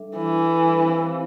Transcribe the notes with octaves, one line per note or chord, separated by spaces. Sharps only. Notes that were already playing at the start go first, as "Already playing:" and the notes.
Already playing: G3 D4 A4 E5
E3
C4 E4 G4 C5 F5